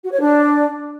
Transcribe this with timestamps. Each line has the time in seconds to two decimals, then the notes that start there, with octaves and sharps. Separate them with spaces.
0.04 F#4
0.12 C#5
0.20 D4